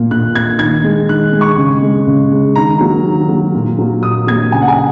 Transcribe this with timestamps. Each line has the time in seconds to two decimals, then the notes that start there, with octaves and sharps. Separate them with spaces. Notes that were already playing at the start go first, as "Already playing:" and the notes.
Already playing: A#2 A#3
0.11 A#2 F#6
0.35 A#3 G#6
0.59 D#3 G#6
0.84 G#3
1.09 D#3 F#6
1.33 G#3
1.41 C#6
1.57 C#3
1.82 G#3
2.07 C#3
2.31 G#3
2.56 D#3 A#5
2.81 F#3 A#3
3.05 D#3
3.29 F#3 A#3
3.54 A#2
3.79 F#3 A#3
4.03 A#2 D#6
4.27 F#3 A#3 G#6
4.52 C#3 G#5
4.62 F#5
4.68 G#5